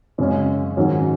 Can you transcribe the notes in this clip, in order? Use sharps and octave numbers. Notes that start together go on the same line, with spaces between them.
F#2 C#3 G#3 C#4
G#2 D#3 F#3 C#4